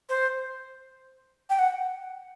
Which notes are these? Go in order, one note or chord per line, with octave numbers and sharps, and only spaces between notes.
C5
G5
F#5